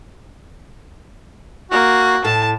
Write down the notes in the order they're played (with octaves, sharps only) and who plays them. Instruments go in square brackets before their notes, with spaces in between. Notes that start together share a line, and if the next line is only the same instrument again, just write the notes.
[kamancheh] A#3 [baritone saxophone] F#4
[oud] A2 [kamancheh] A5